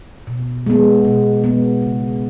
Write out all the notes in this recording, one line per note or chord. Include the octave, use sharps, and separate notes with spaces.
B2
G#3 B3
B2
G#3 B3
C#3